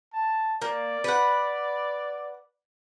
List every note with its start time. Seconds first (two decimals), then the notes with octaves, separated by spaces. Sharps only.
0.13 A5
0.62 A#3 D5
1.04 B4 F#5